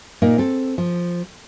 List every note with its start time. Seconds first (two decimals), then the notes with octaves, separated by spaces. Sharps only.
0.22 A#2 A#3 D#4
0.38 C4 A4
0.78 F3